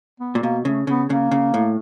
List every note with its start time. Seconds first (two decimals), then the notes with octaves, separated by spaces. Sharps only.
0.20 B3
0.35 A#2
0.42 B2 A#3
0.65 C#3 A3
0.87 C#3 B3
1.09 C#3 A#3
1.31 C#3
1.54 A2